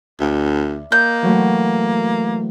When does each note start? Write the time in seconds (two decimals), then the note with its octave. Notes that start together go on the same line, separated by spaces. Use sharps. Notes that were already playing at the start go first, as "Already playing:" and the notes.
0.20 D2 D5 E5
0.92 A#3 D#5 G6
1.22 E3 F#3 A3